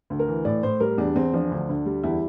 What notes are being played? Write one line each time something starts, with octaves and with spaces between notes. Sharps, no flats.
D2
A#4
E3
A2 D5
A2 C5
G3 A#4
E2 D4
E2 C4
F3 D4
D2
D2
G3
E2 E4